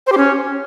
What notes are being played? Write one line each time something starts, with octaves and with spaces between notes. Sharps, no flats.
C5
G4
C#4